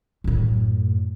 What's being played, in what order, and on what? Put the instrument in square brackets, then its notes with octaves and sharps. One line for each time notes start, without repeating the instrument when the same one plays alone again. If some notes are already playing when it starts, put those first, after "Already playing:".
[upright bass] F#2 A2